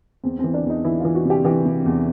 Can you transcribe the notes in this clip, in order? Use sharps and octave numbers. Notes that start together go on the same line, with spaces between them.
E2 C4
E3 C4
D4
E2
D#4
E3 E4
E3 F4
F#4
C3 G4
E3 G4
C3
E2